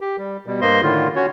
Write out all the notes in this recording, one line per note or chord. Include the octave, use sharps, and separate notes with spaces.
G4
G3
B2 G3
G2 A#3 C5 D#5 C6
A2 D3 D#3 F4
C#4 F#4 C#5